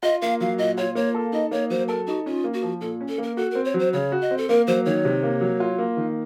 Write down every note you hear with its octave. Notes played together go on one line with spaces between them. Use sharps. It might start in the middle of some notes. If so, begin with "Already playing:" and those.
F4 D#5
A#3 F5
F#3 F5
A#2 D#5
F4 C#5
A#3 C#5
A4
D#4 D#5
A#3 C#5
F#3 C5
A4 A#4
D#4 F#4
C#4 F4
A#3
F#4
F3
A#2 A4
C#4
A4
A#3 A#4
F#4 A4
C4 A#4
C#5
F#3
C5
C#3 C#5
F#4
D#5
C4
A4
A#3 A#4
F#3 C5
D#3 C#5
C3
A#3
F#3
F4
A#3
D#3